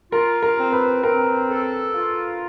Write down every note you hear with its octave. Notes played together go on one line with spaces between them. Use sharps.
F4 A#4
A#4
C4
B4
C4 A#4
A4
F4